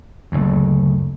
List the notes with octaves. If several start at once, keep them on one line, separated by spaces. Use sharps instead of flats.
F#1 D2